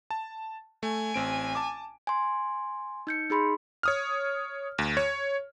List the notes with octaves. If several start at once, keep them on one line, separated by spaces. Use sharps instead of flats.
A5
A3 G#5
A1 C4 D7
A5 D6
G#5 C6
D#4 G6 C#7
D#4 G#4 B5 C6
C#5 D#6 F6
D2
C#5